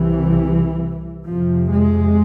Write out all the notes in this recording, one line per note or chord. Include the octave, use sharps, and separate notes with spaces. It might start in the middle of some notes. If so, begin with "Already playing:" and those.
Already playing: C2 C3 E3
F2 C3 F3
G#3